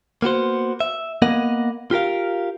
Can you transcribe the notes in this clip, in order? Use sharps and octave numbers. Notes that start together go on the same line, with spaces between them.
A#3 B3 F#4 C5
E5
A#3 B3 A#4 D#5 F#5
F4 G4 A#4 F5